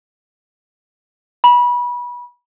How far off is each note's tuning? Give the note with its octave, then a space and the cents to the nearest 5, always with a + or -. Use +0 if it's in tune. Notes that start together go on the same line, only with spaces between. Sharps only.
B5 -25